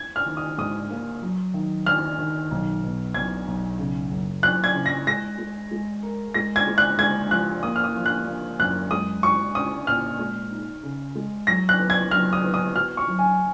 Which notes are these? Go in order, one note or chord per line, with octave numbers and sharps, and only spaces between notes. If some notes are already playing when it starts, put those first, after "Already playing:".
Already playing: G#6
F6
D#3
D#6
G#2 D#6
A#3
F#3
D#3
D#3 F6
D#3
B1
B2
B1 G#6
B1
C#3
F#1
F#3 F#6
G#6
C#3
A#6
G#3 A#6
G#3
G#3
A#4
G#3 A#6
G#6
G#3
F#6
G#3 G#6
F3 F#6
A#3 D#6
F6
D#6
F3
F#6
A#3
F#2 F#6
G#3 D#6
F#4 C#6
C#4 D#6
A#2 F6
G#3
D#4
C#3
G#3
F#3 A#6
F#6
B3
G#6
F#3 F6
D#6
B3
D#6
F#4 F6
C#6
F#3
G#5